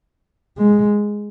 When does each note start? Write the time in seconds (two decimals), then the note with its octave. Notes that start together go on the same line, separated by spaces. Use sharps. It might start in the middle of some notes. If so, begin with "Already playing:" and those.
0.58 G#3